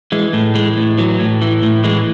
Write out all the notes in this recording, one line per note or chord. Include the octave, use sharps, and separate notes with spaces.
E3 G#3
A2
E3 G#3
A2
E3 F#3
A2
E3
A2
E3 G#3